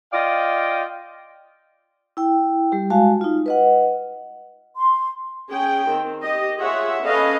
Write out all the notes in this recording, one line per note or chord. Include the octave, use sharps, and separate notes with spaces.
F4 D5 D#5 F5 G5
E4 G5
G3 G4
G#3 F#4 F5 G#5 A5
D#4 F4
B4 D#5 F#5
C6
C#4 G#4 G5
D#3 C4
G4 D#5
F4 G#4 C#5 E5 F#5
C#4 A4 B4 D#5 F5